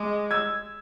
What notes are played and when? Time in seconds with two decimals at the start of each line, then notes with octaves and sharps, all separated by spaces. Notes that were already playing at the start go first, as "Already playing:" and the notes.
Already playing: G#3 D6
0.31 E6 G#6